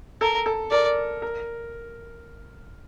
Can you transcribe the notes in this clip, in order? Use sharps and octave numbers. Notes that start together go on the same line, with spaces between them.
A4 A#4
A4
A#4 D5
A#4